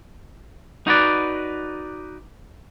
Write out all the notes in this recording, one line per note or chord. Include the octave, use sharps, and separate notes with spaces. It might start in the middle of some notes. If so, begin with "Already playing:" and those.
D#4 F#4 B4 D5